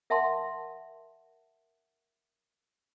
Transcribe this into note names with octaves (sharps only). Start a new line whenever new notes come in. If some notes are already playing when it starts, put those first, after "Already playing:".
A#4 E5 F#5 A5 C6